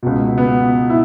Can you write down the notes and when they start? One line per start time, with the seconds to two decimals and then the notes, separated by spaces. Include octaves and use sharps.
0.03 C#2 B2
0.38 B3
0.90 E4